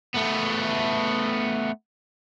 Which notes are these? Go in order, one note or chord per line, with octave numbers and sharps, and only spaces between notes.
A3 B3